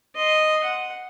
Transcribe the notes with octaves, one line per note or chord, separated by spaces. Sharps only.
D#5 C6
F#5